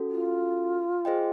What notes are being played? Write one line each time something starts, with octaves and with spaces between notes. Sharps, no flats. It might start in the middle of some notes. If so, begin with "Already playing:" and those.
Already playing: C#4 F#4 A4
F4
G#4 C5 D#5 G5